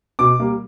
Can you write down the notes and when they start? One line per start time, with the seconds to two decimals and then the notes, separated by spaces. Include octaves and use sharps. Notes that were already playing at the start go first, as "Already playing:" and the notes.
0.19 B2 D6
0.40 G3 A#3